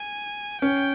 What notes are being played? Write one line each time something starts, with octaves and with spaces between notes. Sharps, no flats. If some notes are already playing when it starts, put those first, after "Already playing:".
Already playing: G#5
C#4 G5